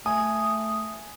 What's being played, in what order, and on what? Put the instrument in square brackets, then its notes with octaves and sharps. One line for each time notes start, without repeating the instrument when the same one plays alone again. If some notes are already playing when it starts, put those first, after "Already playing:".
[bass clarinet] A3 [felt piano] G#5 [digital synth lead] D#6